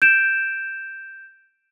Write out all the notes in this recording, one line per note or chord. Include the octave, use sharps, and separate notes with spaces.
G6 D7 E7